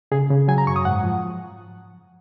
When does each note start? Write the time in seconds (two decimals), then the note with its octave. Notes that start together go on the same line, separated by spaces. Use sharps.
0.12 C#3 G#4
0.30 C#3
0.48 F#3 G#5
0.58 A#5
0.67 F#2 C#6
0.76 D#6
0.85 G#2 F#5
1.04 F3